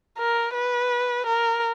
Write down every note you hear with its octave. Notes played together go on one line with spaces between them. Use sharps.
A#4
B4
A#4